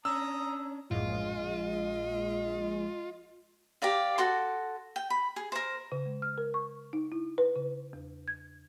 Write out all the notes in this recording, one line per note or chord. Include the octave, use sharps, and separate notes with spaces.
C#4 D4 A#5 D#6 E6
A#1 F#2 A2 G#3 F4 D#5
G4 A#4 D5 F5
F#4 A4 C6
G5
B5
G#4
A#4 C5
C#3
G#3
F6
A#4
C#6
D#4
E4
B4
C#3
E2
G#6